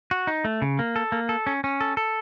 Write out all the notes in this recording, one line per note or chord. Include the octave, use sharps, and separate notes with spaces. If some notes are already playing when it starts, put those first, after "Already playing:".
F#4
D#4
A3
C#3
A#3
A4
A#3
A4
C#4
C#4
A4
A4